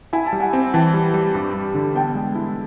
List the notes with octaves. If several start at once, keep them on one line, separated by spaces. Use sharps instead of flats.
E4 G#5
A5
G3
F#5 G#5
C4
E3 G5 A5
G3
G3
G2
G2
D3
B3 G5 A5
G#3
E4